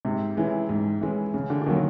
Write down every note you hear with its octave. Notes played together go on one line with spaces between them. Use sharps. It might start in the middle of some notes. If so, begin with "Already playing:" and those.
G#2 C3
E3 G#3 C#4 E4
G#2
E3 G#3 C#4 E4
C#3
D3
D3
D#3 F#3 A#3 C#4 F#4